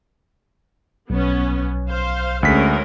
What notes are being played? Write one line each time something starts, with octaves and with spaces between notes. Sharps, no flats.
B1 B3 C#4
C5 F5
D2 G#3 C#4 A#4 B6